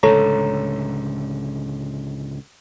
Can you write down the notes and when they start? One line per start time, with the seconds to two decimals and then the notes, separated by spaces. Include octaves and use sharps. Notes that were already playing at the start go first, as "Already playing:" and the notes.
0.03 C#2 A2 D3 A4 C#5 A#5